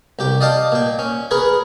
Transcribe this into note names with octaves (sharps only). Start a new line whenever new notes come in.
C2 G4 G5
D5 D#5 F5 G5 A5
A#2 G5
C#4
G#4 A#4 B4 C#5